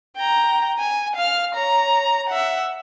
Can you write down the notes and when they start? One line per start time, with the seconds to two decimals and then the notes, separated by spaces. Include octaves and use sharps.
0.16 G5 A#5
0.79 G#5
1.16 F5 F6
1.54 C#5 A#5
2.29 E5 F#5